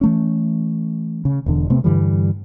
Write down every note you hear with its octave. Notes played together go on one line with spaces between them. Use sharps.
E3 A3 C#4
C#3
E1 E2 D3
C3 A3 B3 C4
G2 D3 E3 G3